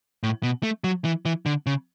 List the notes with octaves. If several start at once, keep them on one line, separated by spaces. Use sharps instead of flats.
A2
B2
A3
F#3
E3
E3
D3
C#3